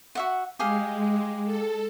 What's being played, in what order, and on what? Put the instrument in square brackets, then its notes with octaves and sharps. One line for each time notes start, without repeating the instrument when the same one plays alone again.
[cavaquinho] F#4 E5 F#5
[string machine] G#3 [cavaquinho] G4 G#4 F5
[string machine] A4